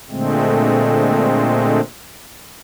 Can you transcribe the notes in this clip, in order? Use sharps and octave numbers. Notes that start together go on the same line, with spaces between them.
A#2 D3 G#3 A3 C4